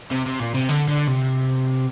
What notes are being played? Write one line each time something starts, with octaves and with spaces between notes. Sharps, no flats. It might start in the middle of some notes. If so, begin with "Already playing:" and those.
C3
C3
A#2
C3
D3
D3
C3